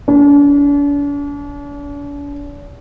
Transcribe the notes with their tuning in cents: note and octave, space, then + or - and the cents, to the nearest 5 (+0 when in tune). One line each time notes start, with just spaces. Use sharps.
D4 -45